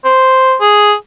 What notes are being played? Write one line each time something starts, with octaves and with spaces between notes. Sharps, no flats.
C5
G#4